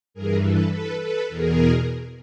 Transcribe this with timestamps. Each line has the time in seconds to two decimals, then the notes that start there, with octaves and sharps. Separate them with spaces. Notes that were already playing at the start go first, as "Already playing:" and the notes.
0.14 G2 E3 G#4 A#4
0.43 A4 B4
0.72 A4 B4
1.00 A4 B4
1.29 E2 B2 G#4 A#4